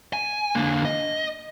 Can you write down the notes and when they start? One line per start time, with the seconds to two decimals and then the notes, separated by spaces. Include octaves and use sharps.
0.13 G#5
0.55 D3 A#3
0.85 D#5